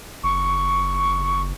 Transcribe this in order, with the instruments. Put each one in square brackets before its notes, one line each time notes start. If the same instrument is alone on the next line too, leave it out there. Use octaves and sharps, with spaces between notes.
[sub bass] F#1 [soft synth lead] C#6